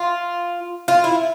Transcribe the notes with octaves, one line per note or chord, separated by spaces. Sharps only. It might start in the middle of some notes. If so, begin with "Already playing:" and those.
Already playing: F4
F4
E4